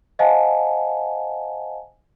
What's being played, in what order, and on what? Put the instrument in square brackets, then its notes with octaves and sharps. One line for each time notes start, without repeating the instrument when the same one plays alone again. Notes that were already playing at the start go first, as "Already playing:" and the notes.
[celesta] C5 D#5 F5 F#5 G#5 A5